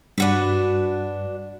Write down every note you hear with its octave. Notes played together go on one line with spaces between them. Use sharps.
G2 D4 F#4 B4